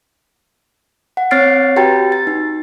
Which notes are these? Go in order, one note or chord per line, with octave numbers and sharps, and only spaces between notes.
F#5
C4 C#5 F6 A6 C7 D7
F#4 G4 B4 G5 A#5 A6
A6
D#4